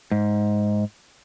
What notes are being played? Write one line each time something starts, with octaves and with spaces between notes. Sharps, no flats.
G#2